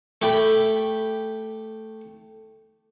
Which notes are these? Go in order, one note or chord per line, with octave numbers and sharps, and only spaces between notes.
A3 G4 G5 B5